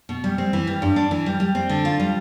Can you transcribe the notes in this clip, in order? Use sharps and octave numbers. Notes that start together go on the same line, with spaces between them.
B2
G3
C4
E3
G3
G2
D4
E3
G3
G3
C4
D3
F4
G3